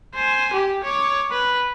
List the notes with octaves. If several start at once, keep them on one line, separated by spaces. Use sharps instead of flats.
C5 G#5
G4
C#5 D6
B4